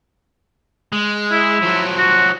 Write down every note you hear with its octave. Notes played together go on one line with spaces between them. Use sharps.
G#3
E4
F3 F#3
F#4